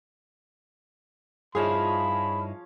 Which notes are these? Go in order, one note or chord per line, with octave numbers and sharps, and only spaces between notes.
G2 F3 C#4 D#4 E4 G#4 F5 B5